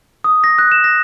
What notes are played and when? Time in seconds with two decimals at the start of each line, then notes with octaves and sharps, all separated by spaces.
0.24 D#6
0.44 A#6
0.58 F#6
0.72 E7
0.84 A#6